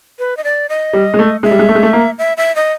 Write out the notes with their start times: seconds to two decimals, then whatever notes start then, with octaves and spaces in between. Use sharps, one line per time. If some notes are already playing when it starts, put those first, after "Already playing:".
0.19 B4
0.37 D#5
0.44 D5
0.69 D#5
0.93 G3
1.14 G#3
1.19 A3
1.43 G#3 E5
1.51 G3
1.59 G#3
1.69 A3
1.75 G#3
1.83 A3
1.93 A#3
2.18 E5
2.37 E5
2.56 D#5